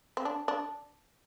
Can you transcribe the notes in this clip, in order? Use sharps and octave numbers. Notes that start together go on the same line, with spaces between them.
C4
D4
D4